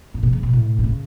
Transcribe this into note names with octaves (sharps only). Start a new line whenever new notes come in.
A2
B2
C#3
B2
A2
D3
C#3